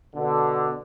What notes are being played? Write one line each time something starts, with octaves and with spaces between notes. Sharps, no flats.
B2 D3